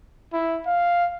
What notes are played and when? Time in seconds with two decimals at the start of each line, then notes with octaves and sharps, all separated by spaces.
0.33 E4
0.66 F5